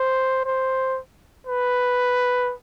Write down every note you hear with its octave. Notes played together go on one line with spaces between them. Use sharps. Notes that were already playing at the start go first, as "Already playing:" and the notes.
Already playing: C5
C5
B4